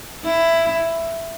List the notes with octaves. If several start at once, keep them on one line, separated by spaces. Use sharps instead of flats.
E4